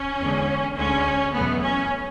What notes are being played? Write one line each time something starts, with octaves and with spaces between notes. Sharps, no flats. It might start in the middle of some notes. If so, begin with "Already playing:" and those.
Already playing: C#4
E2 D3 G#3
D2 D3 G#3 C#4
E2 B2 F#3 A3 B3
C#4